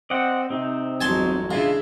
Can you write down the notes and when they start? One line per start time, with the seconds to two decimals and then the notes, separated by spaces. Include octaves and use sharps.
0.10 C4 D5 D#5 F#5
0.50 C3 C4 D#4
1.01 G1 E2 F#3 G#3 G#5 A5 C6
1.51 C#3 G#3 D4 E4 F4